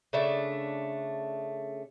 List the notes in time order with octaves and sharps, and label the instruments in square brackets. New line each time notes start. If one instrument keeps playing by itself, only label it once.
[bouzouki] C#3 A3 D4 E5